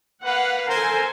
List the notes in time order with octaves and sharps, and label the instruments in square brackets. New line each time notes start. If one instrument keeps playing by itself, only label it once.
[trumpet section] A#3 B4 [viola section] F5 F#5
[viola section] A4 G#5 [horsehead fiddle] A#4 [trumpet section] C5